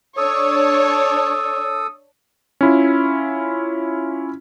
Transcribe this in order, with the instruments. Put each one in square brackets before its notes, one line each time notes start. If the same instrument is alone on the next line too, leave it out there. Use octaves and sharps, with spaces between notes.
[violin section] D4 C#5 [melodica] A4 D#6
[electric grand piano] C#4 E4 F4